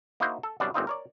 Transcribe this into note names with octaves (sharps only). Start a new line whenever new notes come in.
A#3 D#4 E4 F#4 C5
A4
C2 F#2 B2 G3 D4
G1 A#2 C4 D#4 F4
A#4 C#5 D5